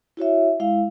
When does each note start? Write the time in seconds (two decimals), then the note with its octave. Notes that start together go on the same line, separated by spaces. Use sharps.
0.17 E4 F#4 C#5 E5
0.60 G#3 E4 F5